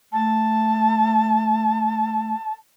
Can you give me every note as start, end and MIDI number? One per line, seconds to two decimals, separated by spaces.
0.13 2.34 57
0.13 2.53 81